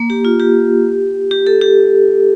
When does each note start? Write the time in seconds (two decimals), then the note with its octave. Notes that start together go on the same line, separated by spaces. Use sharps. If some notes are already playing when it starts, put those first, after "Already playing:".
Already playing: A#3
0.10 G4
0.25 F4
0.40 G4
1.31 G4
1.47 A4
1.61 G4